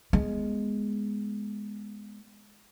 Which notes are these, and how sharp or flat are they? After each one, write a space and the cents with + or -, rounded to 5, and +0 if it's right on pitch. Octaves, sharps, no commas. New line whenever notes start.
G#3 +0 B3 +0